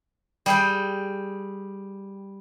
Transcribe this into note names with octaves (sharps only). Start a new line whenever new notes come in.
G3 G#4 G5